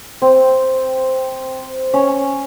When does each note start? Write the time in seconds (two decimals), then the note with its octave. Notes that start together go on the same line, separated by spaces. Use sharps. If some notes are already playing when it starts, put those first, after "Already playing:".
0.22 C4
1.94 C#4